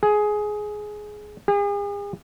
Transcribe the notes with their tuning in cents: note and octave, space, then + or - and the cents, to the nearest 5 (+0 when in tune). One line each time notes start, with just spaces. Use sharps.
G#4 +15
G#4 -40